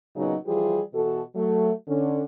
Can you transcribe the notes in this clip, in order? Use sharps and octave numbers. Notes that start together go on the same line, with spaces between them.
A#2 C#3 F#3 B3 D#4
E3 F3 G3 F4 G4 G#4
B2 E3 F#4 A4
F#3 A3
D3 C#4